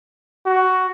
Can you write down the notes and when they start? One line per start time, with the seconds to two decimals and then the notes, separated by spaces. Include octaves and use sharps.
0.46 F#4